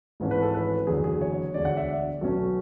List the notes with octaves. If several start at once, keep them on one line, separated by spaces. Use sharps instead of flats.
G#1 G#2 E3 A3 C#4
B4
A4
B4
F#1 E2 D3 F#3 G#4
G#4
C#5
E1 D2 D3 G#3 D5
F#5
E5
D5
B1 B2 F#3 A3 C#4